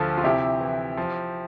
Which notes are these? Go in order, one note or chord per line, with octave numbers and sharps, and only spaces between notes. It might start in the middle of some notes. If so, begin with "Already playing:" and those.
Already playing: D2 F3 F4 A4
F4
C3 E4 G4
E3
F3